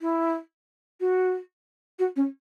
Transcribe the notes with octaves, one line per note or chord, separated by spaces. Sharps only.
E4
F#4
F#4
C#4